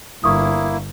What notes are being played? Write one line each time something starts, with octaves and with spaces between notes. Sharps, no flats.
G1 A#3 E4 C#6 D#6